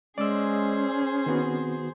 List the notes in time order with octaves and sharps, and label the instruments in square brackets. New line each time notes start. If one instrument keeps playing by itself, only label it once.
[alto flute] G#3 [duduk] C#4 [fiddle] G#4 C5 [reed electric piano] D5 D6 E6
[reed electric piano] D#3 B3 F#4 [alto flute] C4